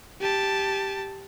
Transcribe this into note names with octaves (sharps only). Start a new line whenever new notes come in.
G4 A5